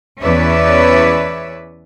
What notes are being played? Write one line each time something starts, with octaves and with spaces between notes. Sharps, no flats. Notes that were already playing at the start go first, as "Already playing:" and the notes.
E2 C#4 B4 C#5 D5 E5